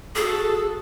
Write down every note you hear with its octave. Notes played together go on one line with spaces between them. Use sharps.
F#4 G#4 A4